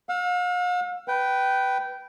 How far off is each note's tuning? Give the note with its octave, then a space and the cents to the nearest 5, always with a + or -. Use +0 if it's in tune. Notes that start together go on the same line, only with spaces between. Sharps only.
F5 +45 E6 +25
B4 +0 G5 -15